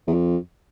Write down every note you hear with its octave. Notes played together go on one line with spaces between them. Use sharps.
E2
F2